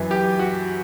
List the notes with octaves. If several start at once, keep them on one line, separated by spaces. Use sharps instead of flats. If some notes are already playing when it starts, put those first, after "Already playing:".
Already playing: F#2 E3
G4
F#4